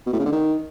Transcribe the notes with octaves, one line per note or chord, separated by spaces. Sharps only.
B2
A2
C#3
D3
D#3